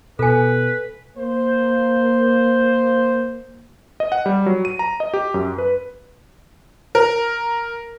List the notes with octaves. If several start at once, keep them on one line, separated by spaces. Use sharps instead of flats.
B2 A4 B4 G#5
A#3 C5
D#5
F#5
G3
F#3
D#7
A#5
D#5
G4
F#2
B4
A#4